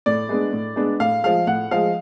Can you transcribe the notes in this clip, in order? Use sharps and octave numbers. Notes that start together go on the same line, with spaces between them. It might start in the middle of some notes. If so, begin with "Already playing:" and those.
A2 D5
G#3 B3 D4
A2
G#3 B3 D4
A2 F5
F3 G#3 F5
A2 F#5
F3 G#3 F5